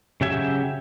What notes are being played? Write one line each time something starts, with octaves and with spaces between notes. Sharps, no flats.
C#3 F#3 G4 E5 G#5